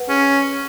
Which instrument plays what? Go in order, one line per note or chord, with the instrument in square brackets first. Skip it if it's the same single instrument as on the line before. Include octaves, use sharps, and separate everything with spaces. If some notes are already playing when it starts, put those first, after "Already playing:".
Already playing: [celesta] B4 F#5
[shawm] C#4 [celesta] G#4